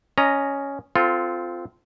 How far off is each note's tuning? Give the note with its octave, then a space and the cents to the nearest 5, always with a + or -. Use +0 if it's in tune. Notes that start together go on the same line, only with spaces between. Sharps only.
C#4 +0 D#5 -10 A#5 +0
C4 -15 F4 +0 A4 +0